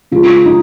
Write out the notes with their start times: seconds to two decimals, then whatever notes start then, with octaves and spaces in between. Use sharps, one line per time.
0.11 C#3 G#3 F4
0.46 D#4